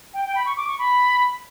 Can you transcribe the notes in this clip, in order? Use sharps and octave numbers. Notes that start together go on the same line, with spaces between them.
G5
G5
B5
C#6
D6
C#6
B5